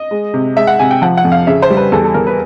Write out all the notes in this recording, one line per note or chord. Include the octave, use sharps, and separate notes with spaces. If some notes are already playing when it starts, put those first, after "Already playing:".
Already playing: D#5
G#3
C3
G#3 E5
F#5
C3 G#5
G5
F3 F#5
F#5
F2
F5
C#3 E5
C5
G3
B4
E2 A4
A4
E2 A#4
B4